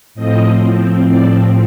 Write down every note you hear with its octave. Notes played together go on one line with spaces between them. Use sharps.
A2 F3 C4 D#5
D5